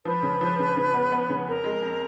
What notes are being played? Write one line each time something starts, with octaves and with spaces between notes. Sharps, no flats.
F3 B4
C#3
F3
C#3
C#3
B3
B3
C#3
F2 A#4
G#3
F2